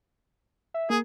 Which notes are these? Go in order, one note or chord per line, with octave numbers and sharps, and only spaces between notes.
E5
A#3 G#4